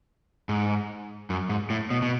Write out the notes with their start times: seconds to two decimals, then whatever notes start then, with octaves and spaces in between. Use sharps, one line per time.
0.49 G#2
1.30 F#2
1.49 G#2
1.70 A2
1.90 B2
2.02 B2